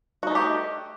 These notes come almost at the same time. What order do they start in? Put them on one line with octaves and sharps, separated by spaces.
F#4 D#4 A3 G4